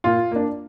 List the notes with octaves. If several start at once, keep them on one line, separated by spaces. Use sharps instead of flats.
A#2 F4
A#3 D4